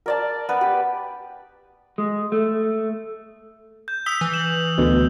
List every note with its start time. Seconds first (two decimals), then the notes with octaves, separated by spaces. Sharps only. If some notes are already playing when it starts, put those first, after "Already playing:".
0.06 A#4 D5 A5
0.49 B3 B4
0.61 G4
1.98 G#3
2.32 A3
3.88 G6
4.06 D#6 E6 B6 G7
4.21 E3 G7
4.34 E7 F#7
4.78 D2 B2